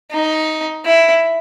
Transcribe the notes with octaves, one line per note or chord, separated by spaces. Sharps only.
D#4
E4